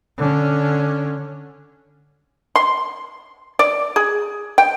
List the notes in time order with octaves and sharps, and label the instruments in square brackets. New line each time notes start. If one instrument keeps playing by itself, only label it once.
[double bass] D3 C#4
[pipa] C6
D5
G#4
G5